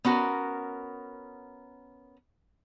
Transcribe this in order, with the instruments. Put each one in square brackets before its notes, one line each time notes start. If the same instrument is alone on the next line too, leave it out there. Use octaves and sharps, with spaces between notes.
[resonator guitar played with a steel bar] B3 C#4 F#4 A#4